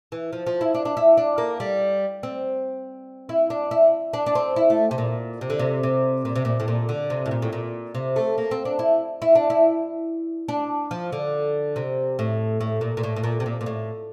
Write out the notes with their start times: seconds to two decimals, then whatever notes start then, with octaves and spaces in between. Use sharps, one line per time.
0.12 E3
0.33 F3
0.47 F3
0.61 E4
0.75 D4
0.85 D4
0.97 E4
1.17 D4
1.38 A#3
1.60 G3
2.23 C4
3.29 E4
3.50 D4
3.71 E4
4.14 D4
4.26 D4
4.35 C4
4.56 E4
4.70 A3
4.91 C3
4.98 A#2
5.41 C3
5.50 D3
5.59 C3
5.83 C3
6.25 A#2
6.35 C3
6.45 A#2
6.60 A2
6.68 A#2
6.89 D3
7.10 C3
7.26 A2
7.31 A#2
7.42 A2
7.53 A#2
7.95 C3
8.16 A3
8.38 A#3
8.51 C4
8.65 D4
8.79 E4
9.22 E4
9.35 D4
9.50 E4
10.48 D4
10.91 F3
11.12 D3
11.76 C3
12.19 A2
12.61 A2
12.81 A#2
12.97 A#2
13.03 A2
13.16 A2
13.23 A#2
13.40 C3
13.46 A#2
13.61 A#2
13.66 A2